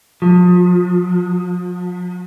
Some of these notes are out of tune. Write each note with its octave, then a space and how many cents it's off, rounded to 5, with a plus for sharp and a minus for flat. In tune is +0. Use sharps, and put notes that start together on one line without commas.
F3 +40